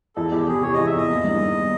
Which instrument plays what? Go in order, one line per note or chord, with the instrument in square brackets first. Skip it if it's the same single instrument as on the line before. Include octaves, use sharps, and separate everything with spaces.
[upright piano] E2 [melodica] A4
[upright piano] E2 [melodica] G4
[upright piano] C3 [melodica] G#4
[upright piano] C3 [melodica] C#5
[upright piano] E2 [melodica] D#5
[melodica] E5
[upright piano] E2 [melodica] D#5
[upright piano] A#3
G2
D#3